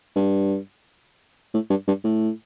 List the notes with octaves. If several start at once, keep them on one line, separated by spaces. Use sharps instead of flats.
G2
A2
G2
G2
A2